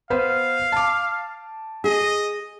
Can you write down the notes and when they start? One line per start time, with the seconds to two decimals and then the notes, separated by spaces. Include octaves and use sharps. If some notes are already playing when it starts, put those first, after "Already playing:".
0.10 B3 B4 C5 F5
0.72 A5 D6
1.84 G#4 D#5